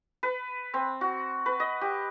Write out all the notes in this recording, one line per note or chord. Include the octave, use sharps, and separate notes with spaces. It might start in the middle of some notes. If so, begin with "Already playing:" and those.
B4
C4
F#4
B4
D#5
G4